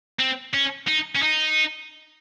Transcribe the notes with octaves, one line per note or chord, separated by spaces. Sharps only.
C4
C#4
D#4
C#4
D#4